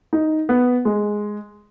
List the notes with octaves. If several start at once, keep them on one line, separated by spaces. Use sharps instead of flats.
D#4
B3
G#3